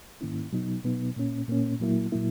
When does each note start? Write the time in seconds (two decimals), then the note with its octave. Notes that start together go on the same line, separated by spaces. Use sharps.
0.21 G#2 D#3 A#3 C#4 E4
0.53 B2 F#3 B3 D#4
0.85 B2 F#3 B3 D#4
1.16 A#2 A#3 C#4
1.49 A#2 A#3 C#4
1.80 A#2 F#3 A#3 E4
2.12 A#2 F#3 A#3 E4